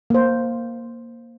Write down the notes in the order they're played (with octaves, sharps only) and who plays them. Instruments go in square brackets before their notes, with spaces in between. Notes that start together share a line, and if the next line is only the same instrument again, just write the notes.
[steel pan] A#3 C5